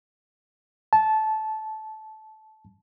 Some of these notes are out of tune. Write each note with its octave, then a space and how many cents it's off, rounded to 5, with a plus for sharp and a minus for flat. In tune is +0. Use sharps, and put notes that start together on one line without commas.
A5 -15